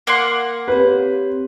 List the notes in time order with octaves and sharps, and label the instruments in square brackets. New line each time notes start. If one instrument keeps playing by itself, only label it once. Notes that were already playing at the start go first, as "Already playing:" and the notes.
[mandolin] A#3 F#5 C6
[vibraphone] C4 G4 C#5 [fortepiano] B4